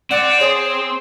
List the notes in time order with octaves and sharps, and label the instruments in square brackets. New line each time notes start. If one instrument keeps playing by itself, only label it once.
[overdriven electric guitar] C4 [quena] D5 [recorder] F#5
[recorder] G#4 [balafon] C#5 [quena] C6